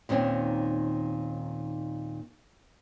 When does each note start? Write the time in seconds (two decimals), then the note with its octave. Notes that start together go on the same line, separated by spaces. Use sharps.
0.09 D#2 A#2 D#3 C4 C#4